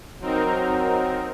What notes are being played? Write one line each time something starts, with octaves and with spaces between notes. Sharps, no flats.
F#3 C4 D#4 A#4